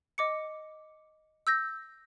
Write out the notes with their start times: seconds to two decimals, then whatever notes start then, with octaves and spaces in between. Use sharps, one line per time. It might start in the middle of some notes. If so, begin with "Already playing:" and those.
0.18 D#5 D6 C#7
1.47 E6 G6 A#6